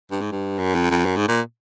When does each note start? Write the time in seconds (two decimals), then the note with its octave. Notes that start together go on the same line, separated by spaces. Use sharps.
0.11 G2
0.21 G#2
0.32 G2
0.59 F#2
0.75 F2
0.90 F2
1.05 F#2
1.17 G#2
1.28 A#2